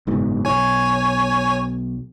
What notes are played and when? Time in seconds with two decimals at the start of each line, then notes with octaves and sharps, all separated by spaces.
0.07 F#1 G#2 B2
0.45 B1 C#5 G#5